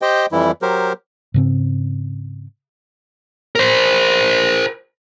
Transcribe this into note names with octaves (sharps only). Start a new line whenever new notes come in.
G4 C5 D#5 G5
F2 E3 G3 E4
F#3 G4 A#4 C5
G#2 C#3 C4
A#4 C5